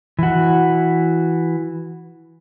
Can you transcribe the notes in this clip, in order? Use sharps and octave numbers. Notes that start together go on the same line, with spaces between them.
E3 F#4